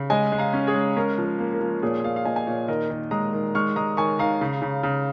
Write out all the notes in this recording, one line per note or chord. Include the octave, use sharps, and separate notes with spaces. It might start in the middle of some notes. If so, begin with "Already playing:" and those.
Already playing: C#3
G#3 D#5 G#5
G#3
F5 A#5
C#4
G#4 C#5
G#3
C#4 A#4
F3
A#4
A#3
A#4
F3
A#2 G#4 C#5
A#2 C#5 F5
F5
A#2 D#5 G#5
G#5
A#2 C#5 F5
D#3 A#4 D#5
D#3
G#3 A#5 D#6
D#3
G#3 C#6 F6
G#3 A#5 D#6
D#3 G#5 C#6
D#3 F5 A#5
C#3
C#3
C#3